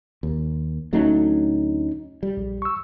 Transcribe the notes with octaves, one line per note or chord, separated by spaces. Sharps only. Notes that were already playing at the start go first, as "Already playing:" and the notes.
D#2
D2 F#3 A3 C#4 D#4
G3
A#1
C#6 E6